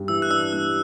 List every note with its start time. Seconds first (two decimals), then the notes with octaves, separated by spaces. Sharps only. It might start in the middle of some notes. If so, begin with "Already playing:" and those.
Already playing: G2 G3
0.08 E3 E6
0.22 F#6
0.30 D4 E6
0.53 G3 F#6